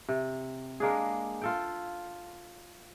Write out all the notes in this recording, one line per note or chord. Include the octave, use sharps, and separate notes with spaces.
C3
G#3 A#3 D4 G#4
F4 A4 G5